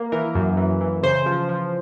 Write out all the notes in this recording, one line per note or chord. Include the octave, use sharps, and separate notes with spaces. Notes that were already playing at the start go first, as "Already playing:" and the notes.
Already playing: A#3
E3 A#4
F#2
E3
E3
C#3 C5
F3
F3